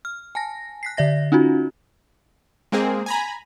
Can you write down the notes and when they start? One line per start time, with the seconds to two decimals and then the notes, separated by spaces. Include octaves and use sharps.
0.05 F6
0.35 G#5 A5 A#6
0.83 F#6 B6 C7
0.97 D3 D5 E5 A#6
1.32 C#4 D#4 F4 F#4
2.72 G#3 A#3 C4 G#4
3.06 G#5 A#5 B5